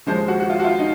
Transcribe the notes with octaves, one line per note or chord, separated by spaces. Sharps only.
D#2 C#3 F3 G#3 C5
F#4
F#4
F4
F#4
F4
D#4